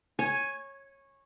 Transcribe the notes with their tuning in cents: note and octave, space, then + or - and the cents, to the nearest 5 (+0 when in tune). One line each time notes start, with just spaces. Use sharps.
C#5 -15 G#5 +5